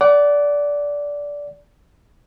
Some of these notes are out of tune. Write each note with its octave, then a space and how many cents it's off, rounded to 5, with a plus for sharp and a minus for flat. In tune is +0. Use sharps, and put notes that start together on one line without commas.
D5 -15 F#5 +25